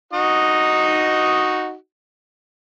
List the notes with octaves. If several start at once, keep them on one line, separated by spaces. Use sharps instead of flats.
D#4 F#4 D#5